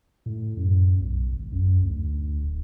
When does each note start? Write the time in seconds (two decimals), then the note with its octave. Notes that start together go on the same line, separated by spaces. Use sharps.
0.26 A2
0.57 F#2
1.00 B1
1.33 G#1
1.52 F#2
1.84 D2
2.43 D1